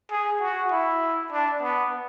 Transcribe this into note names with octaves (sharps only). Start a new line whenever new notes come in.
G#4
F#4
E4
D4
B3